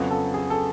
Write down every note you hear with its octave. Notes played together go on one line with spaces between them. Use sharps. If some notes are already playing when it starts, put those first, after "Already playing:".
Already playing: F2 C#3 F#3 B3 A4
A4
G#4
A4